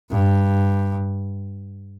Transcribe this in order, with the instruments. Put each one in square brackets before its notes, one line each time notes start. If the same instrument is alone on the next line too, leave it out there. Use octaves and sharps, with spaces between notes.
[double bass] G2